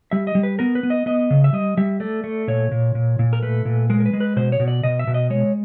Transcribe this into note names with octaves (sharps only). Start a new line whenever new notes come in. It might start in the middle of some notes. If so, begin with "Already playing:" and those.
G3 E5
D#5
G3
B4
B3 A#4
B4
B3
D#5
B3 D#5
C#3
E5
G3 D#5
G3 E5
A3 D5
A3
A#2 C#5
A#2
A#2
A#2
A#4
A3 B4
A#2
G#3 A#4
A#4
B4
G#3
B4
B2 C5
C#5
B2
D5
B2 D#5
E5
B2
D#5
G#3 C#5